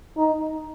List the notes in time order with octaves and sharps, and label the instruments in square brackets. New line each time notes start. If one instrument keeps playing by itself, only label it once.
[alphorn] D#4